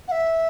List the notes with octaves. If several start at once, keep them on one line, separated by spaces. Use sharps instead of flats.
F#5
E5